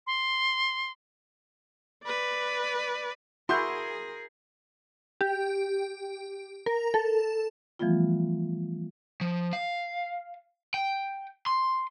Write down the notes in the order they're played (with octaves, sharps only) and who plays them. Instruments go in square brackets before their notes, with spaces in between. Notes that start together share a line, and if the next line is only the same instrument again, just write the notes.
[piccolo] C6
[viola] B4 D5
[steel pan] E4 F#4 [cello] G#4 A#4 [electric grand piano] C6 G6
[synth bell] G4
A#4
A4
[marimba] E3 F3 G3 A3 B3 F4
[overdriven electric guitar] F3
F5
G5
C6